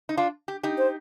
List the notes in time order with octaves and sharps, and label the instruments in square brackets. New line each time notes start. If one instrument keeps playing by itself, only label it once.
[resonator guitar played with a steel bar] D#4
D4 F4
G4
D#4 G4
[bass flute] C5